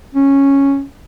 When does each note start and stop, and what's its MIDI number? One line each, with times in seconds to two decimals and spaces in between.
0.15 0.83 61